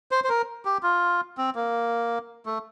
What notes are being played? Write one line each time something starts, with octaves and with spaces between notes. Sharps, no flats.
C5
C5
A#4
G4
F4
C4
A#3
A3